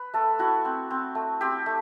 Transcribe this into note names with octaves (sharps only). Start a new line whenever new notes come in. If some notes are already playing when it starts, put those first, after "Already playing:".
Already playing: B4
A3 A4
E4 F#4
C4
C4
A3
C4 G4
A3